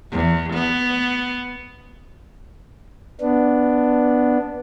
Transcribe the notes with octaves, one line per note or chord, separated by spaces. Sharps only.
E2
B3
B3 D4